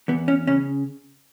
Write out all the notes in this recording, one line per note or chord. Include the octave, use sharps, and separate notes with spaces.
E2 B3
C#4
C#3 C#4